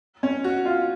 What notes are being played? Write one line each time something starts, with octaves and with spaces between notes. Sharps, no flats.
C#4
F#4
F4